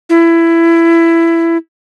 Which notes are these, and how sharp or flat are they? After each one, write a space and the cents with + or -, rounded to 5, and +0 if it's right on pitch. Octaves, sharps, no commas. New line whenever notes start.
E4 +15